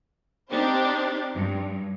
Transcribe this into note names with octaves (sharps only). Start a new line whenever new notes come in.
C4 D4 D#4 G4 C5
G2